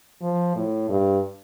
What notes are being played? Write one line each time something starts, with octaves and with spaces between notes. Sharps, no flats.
F3
A2
G2